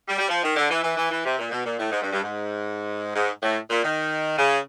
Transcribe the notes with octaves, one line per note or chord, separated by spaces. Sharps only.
G3
G3
F3
D#3
D3
E3
E3
E3
E3
C3
A#2
B2
A#2
A2
G#2
G2
G2
G#2
G#2
A2
A#2
D#3
C#3